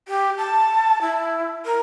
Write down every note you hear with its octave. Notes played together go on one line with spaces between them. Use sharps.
G4
A5
E4
A#4